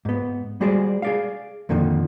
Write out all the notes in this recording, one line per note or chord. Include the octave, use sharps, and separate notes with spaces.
G#2 B3
G3 G#3 F#4 G#4 C5 D5
G#4 D5 F5
F2 A#2 D3 D#3 F3